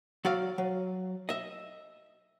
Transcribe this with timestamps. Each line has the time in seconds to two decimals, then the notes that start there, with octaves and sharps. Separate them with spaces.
0.25 F#3 F#4 D5 F5
0.58 F#3
1.29 D#5 E5